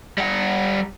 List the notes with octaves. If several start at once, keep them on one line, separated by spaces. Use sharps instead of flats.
G3 F#5